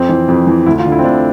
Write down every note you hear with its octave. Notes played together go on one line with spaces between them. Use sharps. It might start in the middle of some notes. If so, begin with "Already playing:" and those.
Already playing: F2 C4
E3
F2
E3
D2 E4
F4
D3
E4
C4
D2 D4